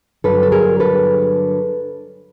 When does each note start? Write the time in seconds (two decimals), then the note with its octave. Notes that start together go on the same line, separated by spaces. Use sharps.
0.24 G2 D3 F#3 A4 B4
0.43 A4
0.52 G#4 A#4
0.80 A4 B4